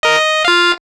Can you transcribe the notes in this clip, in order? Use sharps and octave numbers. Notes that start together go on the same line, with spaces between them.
A#4 D#5
D#5
F4 F5